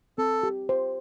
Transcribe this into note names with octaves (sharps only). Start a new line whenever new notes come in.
C4 A4
G4
C5